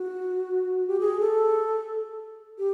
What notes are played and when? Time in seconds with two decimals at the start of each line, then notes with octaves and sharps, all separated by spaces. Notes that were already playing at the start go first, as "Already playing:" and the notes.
Already playing: F#4
0.87 G4
1.00 G#4
1.20 A4
2.58 G4